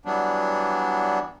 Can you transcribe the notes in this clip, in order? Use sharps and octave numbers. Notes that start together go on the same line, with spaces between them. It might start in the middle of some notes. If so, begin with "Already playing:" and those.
E3 F#3 G3 B3 D4